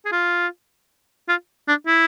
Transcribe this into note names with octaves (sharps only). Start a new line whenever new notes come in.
G#4
F4
F4
D4
E4